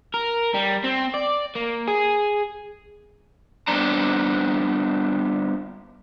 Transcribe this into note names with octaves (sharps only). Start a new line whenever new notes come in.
A#4
G3
C4
D5
A#3
G#4
G3 B3 C4 D4 A#5